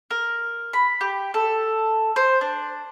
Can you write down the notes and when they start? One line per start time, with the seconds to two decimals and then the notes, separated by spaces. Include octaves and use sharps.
0.11 A#4
0.73 B5
1.01 G4
1.34 A4
2.16 C5
2.41 D4